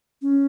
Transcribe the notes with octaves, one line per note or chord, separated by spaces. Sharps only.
C#4